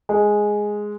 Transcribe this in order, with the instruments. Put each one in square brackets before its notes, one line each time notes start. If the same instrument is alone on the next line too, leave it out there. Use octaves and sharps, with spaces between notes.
[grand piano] G#3